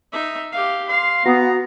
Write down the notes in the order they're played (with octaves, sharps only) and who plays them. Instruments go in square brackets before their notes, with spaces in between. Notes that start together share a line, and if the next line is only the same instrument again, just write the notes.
[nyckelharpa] D#4 E5
G4 F5
[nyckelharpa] F5 [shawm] C6
[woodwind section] B3 [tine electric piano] F#4 [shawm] A#5